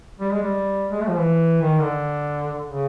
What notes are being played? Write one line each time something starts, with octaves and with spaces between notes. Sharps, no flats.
G3
G#3
G3
G#3
A3
F3
E3
D#3
D3
C#3